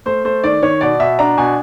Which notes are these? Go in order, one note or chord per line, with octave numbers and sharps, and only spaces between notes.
A3 C5
A3 C5
D#3 D5
D#3 C#5
B2 D5
B2 E5
D4 A#5
B2 G#5